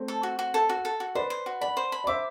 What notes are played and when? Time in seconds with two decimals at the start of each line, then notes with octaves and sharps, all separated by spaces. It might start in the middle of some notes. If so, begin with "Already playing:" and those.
Already playing: A3 C4
0.08 A4
0.23 F#4
0.39 F#4
0.54 A4
0.70 F#4
0.85 A4
1.00 F#4
1.15 B4 C5 D5
1.30 C5
1.46 F#4
1.61 D5 F#5 B5
1.77 C5
1.92 B5
2.04 D5
2.07 C5 E5 D6